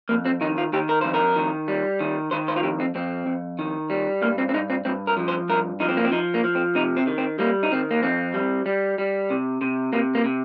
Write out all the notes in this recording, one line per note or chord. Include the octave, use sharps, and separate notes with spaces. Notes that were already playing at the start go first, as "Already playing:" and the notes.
F2 A#3
C4
D#3 D#4
F4
D#3 G4
A#4
F2 C5
A#4
D#3
G3
D#3
D#3 C5
C5
F4
F2 G4
C4
F2 C4
F2
D#3
G3
G2 A#3
C4
C4
G2 D#4
C4
G2 C4
A#4
F3
C5
G2 A#4
F3 D#4
C4
A#3
C4
F3 D#4
A#3
F3
C4
C3 D#4
C4
D#3
C4
G3 A#3
D#4
D#3 C4
A#3
F2 C4
G3
G3
G3
C3
C3
C3 A#3
A#3
C3